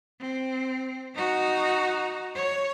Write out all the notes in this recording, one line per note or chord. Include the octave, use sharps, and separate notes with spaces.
C4
D#4 F#4
C#5